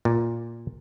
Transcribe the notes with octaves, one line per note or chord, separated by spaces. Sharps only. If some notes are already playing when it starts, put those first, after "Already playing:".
A#2